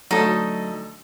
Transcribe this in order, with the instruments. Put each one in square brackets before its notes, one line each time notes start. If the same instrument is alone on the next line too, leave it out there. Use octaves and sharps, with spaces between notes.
[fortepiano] D2 A3 D#5 [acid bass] F#3 [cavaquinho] D#4 A4